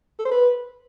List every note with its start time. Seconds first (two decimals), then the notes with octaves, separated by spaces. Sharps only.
0.19 A4
0.25 C5
0.31 B4